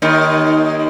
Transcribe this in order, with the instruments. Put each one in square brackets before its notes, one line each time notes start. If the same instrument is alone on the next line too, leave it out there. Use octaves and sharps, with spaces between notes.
[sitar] D#2 D#3